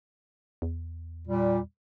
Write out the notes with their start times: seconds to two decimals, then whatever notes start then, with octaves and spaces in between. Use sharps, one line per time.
0.62 E2
1.27 A#2 G3